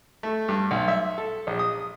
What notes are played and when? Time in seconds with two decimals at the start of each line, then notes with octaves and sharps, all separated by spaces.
0.23 A3
0.48 G2
0.71 B1
0.88 E5
1.18 A4
1.47 A#1
1.59 D#6